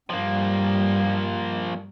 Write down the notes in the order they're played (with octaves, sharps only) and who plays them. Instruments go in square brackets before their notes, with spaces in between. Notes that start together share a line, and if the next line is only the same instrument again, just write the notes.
[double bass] G2 G3 [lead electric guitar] F3 A#3